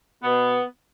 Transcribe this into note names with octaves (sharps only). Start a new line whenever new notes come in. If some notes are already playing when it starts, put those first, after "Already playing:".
B2 B3